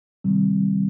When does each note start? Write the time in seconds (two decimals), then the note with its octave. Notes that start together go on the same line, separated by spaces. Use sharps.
0.24 C3 D#3 G3 C4